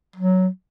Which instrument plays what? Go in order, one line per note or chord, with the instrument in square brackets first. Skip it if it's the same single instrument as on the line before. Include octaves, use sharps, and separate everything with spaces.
[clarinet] F#3